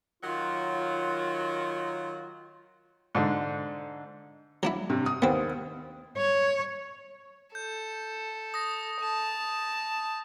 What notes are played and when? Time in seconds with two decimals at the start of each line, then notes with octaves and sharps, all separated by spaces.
0.23 D#3 F#3 F4
3.15 G#2 D3
4.63 F#3 D4 E4
4.90 G2 C3
5.06 D#6
5.22 D#2 B3 C4
6.17 C#5
7.55 A4 G6
8.54 D#6 A#6
9.01 A5